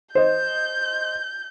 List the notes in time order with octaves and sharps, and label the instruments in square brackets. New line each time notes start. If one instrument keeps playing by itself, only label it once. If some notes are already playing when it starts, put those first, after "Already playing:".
[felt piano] C5 D#5 [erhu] G6